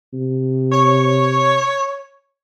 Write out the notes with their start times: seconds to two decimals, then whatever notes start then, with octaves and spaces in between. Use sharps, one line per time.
0.13 C3
0.72 C#5